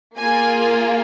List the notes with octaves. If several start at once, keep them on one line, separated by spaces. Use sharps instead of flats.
A#3 F4 G#4 G#5